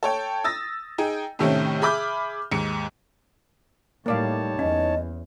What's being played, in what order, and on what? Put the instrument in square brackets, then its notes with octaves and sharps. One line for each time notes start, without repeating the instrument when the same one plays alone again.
[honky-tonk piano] A4 C#5 G5
D#6 E6 A6 A#6
D#4 G#4 G5
A2 C3 D#3 A3 C4 C#4
G#4 E5 B5 D6 F6 G6
D#2 G#2 C#7
[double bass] A2 G3 [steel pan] A#3 D5 F5 [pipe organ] D#4 C#5 A5
[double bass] E2 [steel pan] C#4 [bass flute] D#5